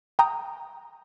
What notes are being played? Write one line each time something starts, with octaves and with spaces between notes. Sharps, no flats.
G5 A#5 D#6 G6